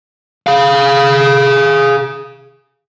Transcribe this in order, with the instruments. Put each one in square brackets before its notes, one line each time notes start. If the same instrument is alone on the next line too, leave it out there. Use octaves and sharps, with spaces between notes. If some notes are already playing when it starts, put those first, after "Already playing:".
[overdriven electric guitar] G#4 F5